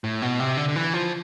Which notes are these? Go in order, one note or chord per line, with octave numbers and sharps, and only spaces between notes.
A2
B2
C3
D3
D3
E3
F3